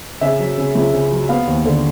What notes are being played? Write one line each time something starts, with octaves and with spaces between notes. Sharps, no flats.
C#3 E5
F#3
C#3
C#2
C#3
F#3
B3 F5
D#2
D3